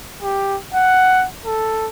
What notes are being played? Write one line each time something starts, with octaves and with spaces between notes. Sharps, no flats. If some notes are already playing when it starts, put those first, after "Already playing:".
G4
F#5
A4